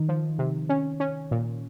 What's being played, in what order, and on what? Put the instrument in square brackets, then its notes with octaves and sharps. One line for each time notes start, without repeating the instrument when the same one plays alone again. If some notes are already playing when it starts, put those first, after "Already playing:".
Already playing: [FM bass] D#3 [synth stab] D#4
[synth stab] F3
C3
C#4
C#4
A#2